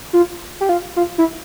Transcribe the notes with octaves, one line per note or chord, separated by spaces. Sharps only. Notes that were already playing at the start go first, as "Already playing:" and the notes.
F4
G4
F4
F4
E4